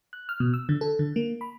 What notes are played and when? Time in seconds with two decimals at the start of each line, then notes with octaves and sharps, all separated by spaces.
0.13 F#6
0.29 F6
0.40 B2
0.54 E6
0.69 D3
0.81 A4
0.99 D3
1.16 A#3
1.41 B5